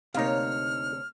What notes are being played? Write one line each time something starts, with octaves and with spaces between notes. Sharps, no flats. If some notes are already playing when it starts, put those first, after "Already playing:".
D2 C3 A#3 D#4 C#5 F5 F6